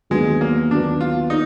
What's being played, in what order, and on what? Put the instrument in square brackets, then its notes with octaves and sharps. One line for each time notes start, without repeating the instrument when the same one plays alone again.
[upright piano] D#2 D3 F#3 B3 [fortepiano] G#3
[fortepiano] A#3
[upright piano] D#2 D3 F#3 B3 [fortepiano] D4
[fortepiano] F4
D#4